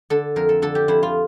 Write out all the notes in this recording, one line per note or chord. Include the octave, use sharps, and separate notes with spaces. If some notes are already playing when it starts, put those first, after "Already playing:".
D3 A4
F2 A#4
A4
D3 A4
G4
F2 E4
F4